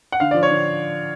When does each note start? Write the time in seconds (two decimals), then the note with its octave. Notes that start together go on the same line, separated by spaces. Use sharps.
0.12 F#5
0.20 D3 F5
0.31 F3 D5
0.43 C#5
0.50 D3